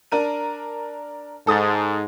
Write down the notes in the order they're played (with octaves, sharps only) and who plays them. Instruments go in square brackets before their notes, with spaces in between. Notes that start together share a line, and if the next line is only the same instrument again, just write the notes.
[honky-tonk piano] D4 A#4 D#7
[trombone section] G#2 [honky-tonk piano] A4 D#6 A6